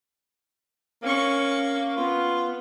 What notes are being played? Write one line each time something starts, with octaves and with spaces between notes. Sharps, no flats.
A#3 C#4 C#6
B3 F4